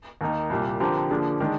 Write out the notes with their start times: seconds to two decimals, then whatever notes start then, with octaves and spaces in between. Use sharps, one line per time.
0.21 D#2 D#3 A#3 D#4
0.50 C2 A#2 G3
0.80 D3 F3 C4 G4 A#4
1.10 D3 F3 A#3 D4 G#4
1.40 D#3 G#3 D4